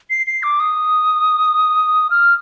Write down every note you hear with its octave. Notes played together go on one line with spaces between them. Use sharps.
C7
C7
D6
D#6
F6